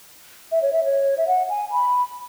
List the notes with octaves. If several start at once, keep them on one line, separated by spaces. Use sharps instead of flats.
E5
C#5
E5
C#5
E5
F#5
G#5
B5